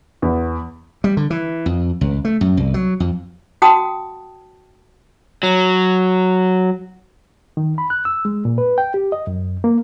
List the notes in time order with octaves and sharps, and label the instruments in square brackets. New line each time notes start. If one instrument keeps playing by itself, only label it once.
[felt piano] E2
[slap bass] G3
D3
E3
F2
C#2
A3
F#2
C2
F#3
F2
[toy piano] F#4 F#5 G5 A5 D#6
[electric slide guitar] F#3
[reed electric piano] D#3
B5
F#6
E6
G#3
A#2
B4
G5
G4
D#5
F#2
A#3